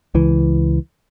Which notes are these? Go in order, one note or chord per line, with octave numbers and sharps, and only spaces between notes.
C#2 E3